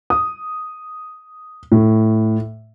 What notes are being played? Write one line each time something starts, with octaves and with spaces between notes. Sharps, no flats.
D#6
A2